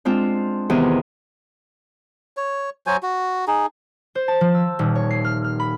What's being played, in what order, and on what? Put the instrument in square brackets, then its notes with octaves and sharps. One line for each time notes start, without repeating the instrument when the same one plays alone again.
[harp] G#3 C4 D4 F4
E2 C3 D#3 E3 G4 G#4
[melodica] C#5
F#3 F#4 C5 G#5
F#4
D#4 G#4
[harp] C5
A5
F3
E6
D#1
C#5
C7
F6
F6
B5